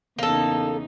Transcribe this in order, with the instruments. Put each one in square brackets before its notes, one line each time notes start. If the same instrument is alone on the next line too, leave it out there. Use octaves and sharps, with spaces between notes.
[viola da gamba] E2 C#3 D#4 [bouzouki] A#3 A4